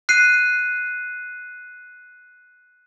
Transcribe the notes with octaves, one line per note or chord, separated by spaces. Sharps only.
F#6 C7 D#7